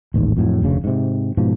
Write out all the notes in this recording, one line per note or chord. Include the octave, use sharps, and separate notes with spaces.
A1 D#2 G#2
F2 A2 F#3
F1 D2 C#3
G#2 C3
G#2 B2 F3